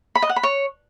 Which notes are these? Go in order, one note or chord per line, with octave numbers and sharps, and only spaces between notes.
B5
D#5
F#5
B5
C#5